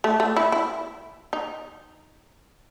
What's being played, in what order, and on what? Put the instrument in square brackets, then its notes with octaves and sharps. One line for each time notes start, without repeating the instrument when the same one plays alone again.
[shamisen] A3
A3
E4
E4
D#4